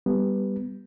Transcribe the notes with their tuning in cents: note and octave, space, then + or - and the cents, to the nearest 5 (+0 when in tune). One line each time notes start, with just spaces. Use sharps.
G3 +5 B3 +0